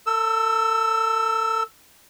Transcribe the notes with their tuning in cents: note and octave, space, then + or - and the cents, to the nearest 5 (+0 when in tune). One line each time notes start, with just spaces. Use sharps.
A4 +35 E6 +0